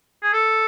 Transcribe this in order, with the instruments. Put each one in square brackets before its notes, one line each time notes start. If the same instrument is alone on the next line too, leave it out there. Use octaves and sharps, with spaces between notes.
[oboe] G#4
A4